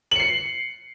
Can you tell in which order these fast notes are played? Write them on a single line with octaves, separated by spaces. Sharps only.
F#7 C#7 C7